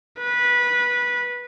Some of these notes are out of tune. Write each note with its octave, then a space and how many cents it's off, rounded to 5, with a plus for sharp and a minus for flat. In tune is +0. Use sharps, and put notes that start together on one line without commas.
B4 -15